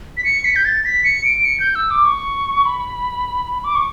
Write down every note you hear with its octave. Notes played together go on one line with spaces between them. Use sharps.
B6
C#7
B6
G6
A6
B6
C#7
D7
C#7
G6
E6
D6
C#6
B5
D6
C#6